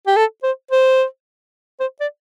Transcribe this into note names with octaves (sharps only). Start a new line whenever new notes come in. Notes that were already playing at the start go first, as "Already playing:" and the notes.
G4
A4
C5
C5
C5
D5